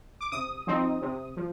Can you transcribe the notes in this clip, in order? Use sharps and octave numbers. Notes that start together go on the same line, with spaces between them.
D6
C3 D#6
F3 C4 D#4
C3
F3